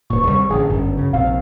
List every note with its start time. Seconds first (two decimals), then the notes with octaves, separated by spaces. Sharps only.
0.10 D1 A#2 C#6
0.27 C2 G3
0.50 A1 D3 G#4
0.69 G1 F#2
0.97 C#3
1.13 A#1 C3 C4 F5